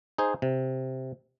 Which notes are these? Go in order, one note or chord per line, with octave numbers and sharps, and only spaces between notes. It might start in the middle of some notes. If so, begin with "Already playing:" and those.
D#4 G#4 C5
C3